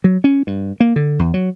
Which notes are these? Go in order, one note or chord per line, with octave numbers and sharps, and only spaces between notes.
F#3
C#4
G2
A#3
D3
E2
F#3